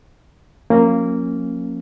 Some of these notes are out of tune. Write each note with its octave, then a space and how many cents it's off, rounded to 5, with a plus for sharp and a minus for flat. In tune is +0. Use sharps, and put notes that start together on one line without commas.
F3 +30 A#3 -10 C#4 -20